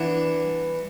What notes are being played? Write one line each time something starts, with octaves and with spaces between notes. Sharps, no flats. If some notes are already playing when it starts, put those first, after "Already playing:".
Already playing: E3 B3 D4 E4